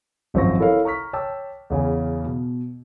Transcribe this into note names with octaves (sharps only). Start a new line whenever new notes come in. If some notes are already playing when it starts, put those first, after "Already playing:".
G#1 F#2 F3 C4 C#6 A#6
E4 A4 A#4 C#5 F5
A#5 C#6 F6 B6
C#5 G5 A5 D6 E6
E2 C#3 C#4 G#5
B2